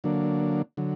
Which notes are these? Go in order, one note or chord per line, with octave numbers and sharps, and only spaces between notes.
D3 F#3 A#3 D4
D3 F#3